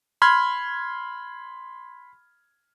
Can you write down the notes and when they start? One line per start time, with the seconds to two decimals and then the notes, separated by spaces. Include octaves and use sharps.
0.22 B5 C6 F6 G#6